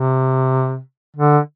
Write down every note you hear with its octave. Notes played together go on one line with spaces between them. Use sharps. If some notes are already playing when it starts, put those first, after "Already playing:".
Already playing: C3
D3